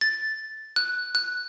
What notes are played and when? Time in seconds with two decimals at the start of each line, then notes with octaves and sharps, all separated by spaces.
0.01 A6
0.76 F#6
1.15 F#6